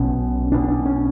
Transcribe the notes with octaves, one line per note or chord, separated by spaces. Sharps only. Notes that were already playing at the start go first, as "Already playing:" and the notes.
Already playing: B1 B2 C#4
B1 B2 D4
D4
C#4